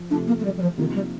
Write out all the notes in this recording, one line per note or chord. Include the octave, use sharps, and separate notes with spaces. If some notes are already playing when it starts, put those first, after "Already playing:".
Already playing: F3
C3 F3 A3 D4
A#3
A3
G3
G3
F3
C3 D#3 F3 A#3 D#4
G3